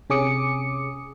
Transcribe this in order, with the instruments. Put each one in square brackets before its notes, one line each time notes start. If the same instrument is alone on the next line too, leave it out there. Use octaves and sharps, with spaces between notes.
[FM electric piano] C3 C#4 G#4 D6 D#6 C#7